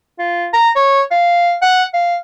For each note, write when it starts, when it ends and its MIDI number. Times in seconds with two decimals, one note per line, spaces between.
0.18 0.47 65
0.53 0.69 82
0.76 1.01 73
1.11 1.56 77
1.62 1.83 78
1.93 2.17 77